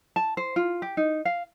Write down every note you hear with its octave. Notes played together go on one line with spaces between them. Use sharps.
A5
C5
F4
G4
D#4
F5